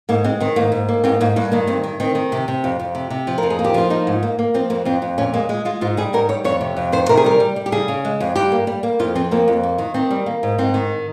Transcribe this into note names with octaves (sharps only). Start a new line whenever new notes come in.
G#2 A#3
G#3 C4
D#3 C4
G#2 A#3
G#2
A#3
G#2 C4
G#2 A#3
G2 A#3
D#3 A#3
G2 C4
D#3
D#3 C4
D#3
C3
C3
F2
F2
C3
C3
F3
F2 A#4
G#4
A#3
G4
F3 F4
A#3 D#4
G#2
A#3
A#3
F3 C4
F2 A#3
F2 C4
F2
A#2 C#4
G#3 A#3
G#3
G#3 F4
G#2 F4
G3 G#4
G#2 A#4
G3 C#5
F2 C#5
C3
F2
D#3 C5
C3 A#4
G#4
G3 A#4
G3
G3
G4
C#3 G#4
C#3
G#3
F2
G2 G4
A#3
G3
A#3
F2 F4
F3 C4
F2 A#3
F2
A#3
D#3
D#3 C4
G3
A#3
G#2
G#2 C4
D#3